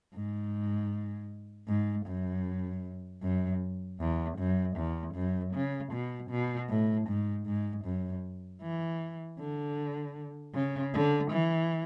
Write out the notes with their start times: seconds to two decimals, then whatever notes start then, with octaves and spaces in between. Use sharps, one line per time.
0.14 G#2
1.68 G#2
2.06 F#2
3.22 F#2
3.99 E2
4.38 F#2
4.76 E2
5.15 F#2
5.54 C#3
5.92 B2
6.30 B2
6.70 A2
7.08 G#2
7.46 G#2
7.85 F#2
8.62 E3
9.39 D3
10.54 C#3
10.93 D3
11.32 E3